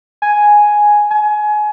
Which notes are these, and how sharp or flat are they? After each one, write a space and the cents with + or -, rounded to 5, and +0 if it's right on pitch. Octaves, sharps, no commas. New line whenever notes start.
G#5 +0
G#5 +25